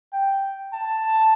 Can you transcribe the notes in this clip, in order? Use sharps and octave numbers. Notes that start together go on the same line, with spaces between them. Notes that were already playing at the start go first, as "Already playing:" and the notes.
G5
A5